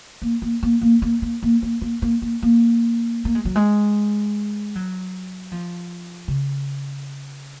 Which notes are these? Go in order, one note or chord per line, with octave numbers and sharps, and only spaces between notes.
A#3
A#3
A#3
A#3
A#3
A#3
A#3
A#3
A#3
A#3
A#3
A#3
A#3
G#3
F#3
G#3
F#3
F3
C#3